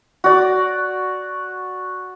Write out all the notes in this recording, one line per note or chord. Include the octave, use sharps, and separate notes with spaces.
F#4 D5